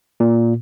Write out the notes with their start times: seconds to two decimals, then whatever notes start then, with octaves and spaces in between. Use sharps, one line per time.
0.20 A#2